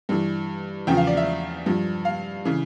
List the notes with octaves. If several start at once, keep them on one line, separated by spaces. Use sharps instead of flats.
G2 E3
E2 C#3 F3 G5
F5
D5
E5
G2 F3
F5
C#3 E3